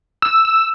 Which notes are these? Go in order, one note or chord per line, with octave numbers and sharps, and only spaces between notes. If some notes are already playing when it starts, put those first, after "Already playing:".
E6
E6